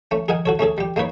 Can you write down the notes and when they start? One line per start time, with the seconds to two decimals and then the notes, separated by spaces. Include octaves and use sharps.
0.11 A3 C#4
0.28 G#4 A#4 D#5 F#5 G#5
0.46 F#4 A4 C#5
0.59 A3 C#4 G#4 A4
0.78 G3 G4
0.96 G#3 A#3 D#4 B4 C#5